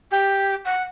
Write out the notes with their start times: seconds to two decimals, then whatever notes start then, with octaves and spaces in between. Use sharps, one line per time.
0.11 G4
0.65 F#5